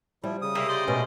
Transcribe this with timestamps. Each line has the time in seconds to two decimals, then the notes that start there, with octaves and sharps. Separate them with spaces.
0.24 F3 G3 E4
0.42 C#3 D#6
0.55 C3 A#3 A#4 E5
0.69 C5 D5 D#5
0.87 B2 G#3 A3 B3 C#4